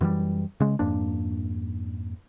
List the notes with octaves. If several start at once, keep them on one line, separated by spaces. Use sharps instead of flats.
F#2 E3 F3 G3
C#3 G#3
F2 G#2 A#3 D4